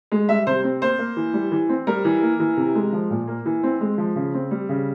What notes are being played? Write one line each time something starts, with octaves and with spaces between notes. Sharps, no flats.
G#3
G3 E5
C3 C5
C4
A#3 C5
A#3
E3
G3
E3
C4
G3 A#4
E3
A#3
E3
C3
G#3
F3
A#2
A#3
E3
C4
G#3
F3
C#3
C4
G3
C#3